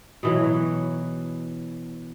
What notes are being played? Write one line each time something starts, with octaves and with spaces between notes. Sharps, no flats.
B2 E3 F#3